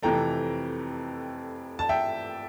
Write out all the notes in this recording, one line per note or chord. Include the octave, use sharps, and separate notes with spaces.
F2 C3 E3 A3 G5 A#5
A5
E5 G5